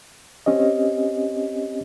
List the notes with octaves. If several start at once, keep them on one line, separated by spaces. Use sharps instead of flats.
C4 C#4 G4 D#5